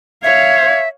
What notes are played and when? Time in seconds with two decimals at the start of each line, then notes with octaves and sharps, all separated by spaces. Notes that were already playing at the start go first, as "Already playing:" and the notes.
0.24 C#5 E5 F5 G#6